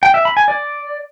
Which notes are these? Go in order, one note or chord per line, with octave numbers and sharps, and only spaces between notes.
G5
E5
B5
G#5
D5